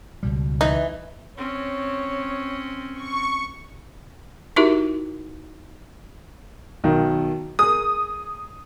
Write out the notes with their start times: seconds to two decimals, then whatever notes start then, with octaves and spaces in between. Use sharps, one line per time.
0.23 C#2 B2 G3
0.61 E3 D#4
1.37 C4 C#4 C#5
2.94 C#6
4.56 D#4 E4 F#4 G4 A#4 E5
6.84 B1 D#3
7.59 G#4 A#4 D#6